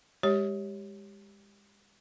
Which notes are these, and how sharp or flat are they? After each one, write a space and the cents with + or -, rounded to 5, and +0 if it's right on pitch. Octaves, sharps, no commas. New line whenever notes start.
G#3 -30 G4 +0 C#5 +0